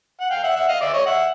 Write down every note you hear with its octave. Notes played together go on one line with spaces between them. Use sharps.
F#5
F5 G5
E5 F#5
E5 F#5
D#5 F5
D5 E5
C#5 D#5
E5 F#5